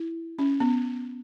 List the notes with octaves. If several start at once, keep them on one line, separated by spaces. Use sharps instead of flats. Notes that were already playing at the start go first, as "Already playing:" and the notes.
Already playing: E4
C#4
B3